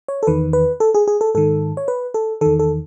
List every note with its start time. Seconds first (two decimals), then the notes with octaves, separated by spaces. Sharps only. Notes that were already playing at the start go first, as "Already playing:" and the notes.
0.08 C#5
0.23 A4
0.27 E2 D#3 B4
0.53 B4
0.80 A4
0.94 G#4
1.08 G#4
1.21 A4
1.35 G#2 D#3 A4
1.77 C#5
1.88 B4
2.14 A4
2.41 E2 D#3 A4
2.59 A4